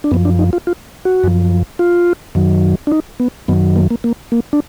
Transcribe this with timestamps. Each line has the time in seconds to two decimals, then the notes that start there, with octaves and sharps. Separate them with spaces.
0.04 D4
0.11 F#2 F3 B3
0.25 D4
0.39 D#4
0.53 F4
0.67 F4
1.05 F#4
1.24 F#2 F3
1.79 F4
2.35 F#2 D#3 F#3
2.87 D4
2.92 D#4
3.20 B3
3.48 F#2 D#3 F#3 B3
3.76 A#3
3.91 A#3
4.04 A#3
4.32 A#3
4.53 D4